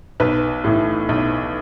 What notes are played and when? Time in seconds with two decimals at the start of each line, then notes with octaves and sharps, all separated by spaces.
0.20 B1 B4
0.64 A2 E3
1.09 B1